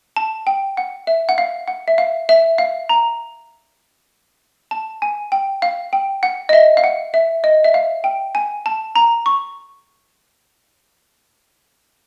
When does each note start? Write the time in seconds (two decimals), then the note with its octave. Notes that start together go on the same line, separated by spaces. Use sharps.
0.17 A5
0.47 G5
0.77 F#5
1.07 E5
1.29 F#5
1.38 F5
1.68 F#5
1.88 E5
1.98 F5
2.29 E5
2.58 F5
2.89 A#5
4.71 A5
5.02 G#5
5.32 G5
5.62 F5
5.93 G5
6.23 F#5
6.49 D#5
6.53 E5
6.77 F5
6.84 F#5
7.14 E5
7.44 D#5
7.64 E5
7.74 F5
8.04 G5
8.35 G#5
8.66 A5
8.96 A#5
9.26 C#6